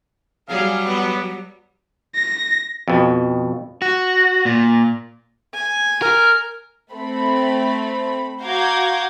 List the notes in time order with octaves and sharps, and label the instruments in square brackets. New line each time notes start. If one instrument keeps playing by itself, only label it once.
[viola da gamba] F#3 G3 [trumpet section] G#4 F5
[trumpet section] B3
[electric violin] A#6
[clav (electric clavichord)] F2 B2
[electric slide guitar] F#4
A#2
[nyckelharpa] G#5
[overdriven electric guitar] A#4 [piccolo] F6
[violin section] A3 C4 B5
F#4 F5 A#5 D6 G6 G#6